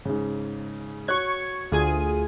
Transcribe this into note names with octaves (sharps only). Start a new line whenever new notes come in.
G#2 C#3
F#4 C#5 C#6 F#6 G#6
D2 F4 G#4 G#5